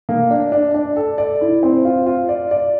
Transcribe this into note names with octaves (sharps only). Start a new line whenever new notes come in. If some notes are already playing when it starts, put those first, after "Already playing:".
A#3
D4
D4
D4
A4
D5
E4
C4
F4
F4
D5
D5